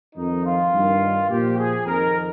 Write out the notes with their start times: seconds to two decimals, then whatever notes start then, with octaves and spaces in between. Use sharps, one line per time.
0.16 F2 D#3 D#4
0.45 F4
0.73 G2 D#3
1.29 A#2 F3 G4
1.58 G#4
1.86 F2 D#3 A#4